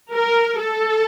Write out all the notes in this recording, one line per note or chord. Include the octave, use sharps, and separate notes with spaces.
A#4
A4